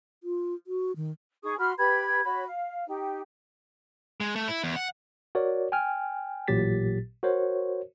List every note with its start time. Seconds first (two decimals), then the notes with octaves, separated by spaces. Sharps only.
0.24 F4
0.67 F#4
0.96 D#3
1.43 D#4 G#4 C#6 D#6
1.59 F#4 B5 C6 F6
1.78 G4 B4 B5 G#6
2.24 F#4 C#5 B5
2.46 F5
2.87 D#4 G4
4.21 G#3
4.36 A3
4.47 E4
4.64 E2
4.76 F#5
5.35 F#4 A#4 C#5 D5
5.72 G5 G#5 F6
6.48 A1 A#2 F#3 G4 A6 B6
7.23 F#4 A#4 C5 C#5